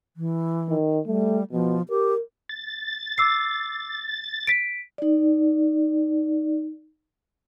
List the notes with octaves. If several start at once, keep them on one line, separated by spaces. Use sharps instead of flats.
E3
D#3
G3 A3
B2 F3
G4 A#4
A6
D6 E6 C7
B6 D7
D#4 D5